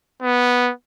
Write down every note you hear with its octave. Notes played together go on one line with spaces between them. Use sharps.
B3